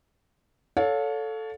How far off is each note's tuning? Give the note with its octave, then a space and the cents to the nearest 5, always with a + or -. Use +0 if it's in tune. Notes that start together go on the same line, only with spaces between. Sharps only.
A4 +0 C#5 +25 F5 +30